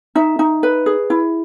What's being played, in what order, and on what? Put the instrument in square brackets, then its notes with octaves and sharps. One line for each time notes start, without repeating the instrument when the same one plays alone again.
[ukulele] D#4 E5
D#4
B4
G#4
E4